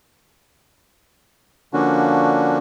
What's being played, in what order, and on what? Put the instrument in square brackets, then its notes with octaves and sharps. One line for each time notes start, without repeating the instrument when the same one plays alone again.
[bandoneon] D3 F3 A#3 C#4 D4 F#4